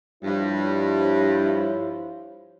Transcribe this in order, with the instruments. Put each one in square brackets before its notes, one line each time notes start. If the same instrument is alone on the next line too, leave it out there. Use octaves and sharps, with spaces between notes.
[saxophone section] G2 [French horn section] F3 E4 C#5